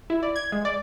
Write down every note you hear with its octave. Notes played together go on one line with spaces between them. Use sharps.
E4
D5
G#6
G#3
D5